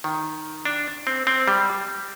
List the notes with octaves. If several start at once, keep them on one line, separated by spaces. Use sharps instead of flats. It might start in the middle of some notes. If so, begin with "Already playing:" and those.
D#3
D4
C4
C4
G3